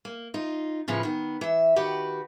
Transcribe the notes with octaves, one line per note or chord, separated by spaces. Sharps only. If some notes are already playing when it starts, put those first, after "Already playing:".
A#3
D#4 F4
A2 C#3 F3 C#4 B4
D#3 B3
E3 E5
D#3 F#4 G4 B4